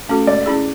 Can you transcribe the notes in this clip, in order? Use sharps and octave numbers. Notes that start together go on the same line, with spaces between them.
A3 C#4 F#4 A4
G#3 D5
C#4 E4 G#4